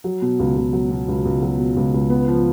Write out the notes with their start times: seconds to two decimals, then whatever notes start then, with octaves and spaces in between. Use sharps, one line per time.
0.04 F#3
0.22 B2
0.39 C#2
0.56 C#2
0.73 F#3
0.91 B2
1.08 C#2
1.25 C#2
1.42 F#3
1.59 B2
1.77 C#2
1.94 C#2
2.10 B3
2.28 F3